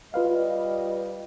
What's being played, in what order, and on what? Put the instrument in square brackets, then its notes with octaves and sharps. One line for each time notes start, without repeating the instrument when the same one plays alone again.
[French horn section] G3 D#5 [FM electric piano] F4 B4 F5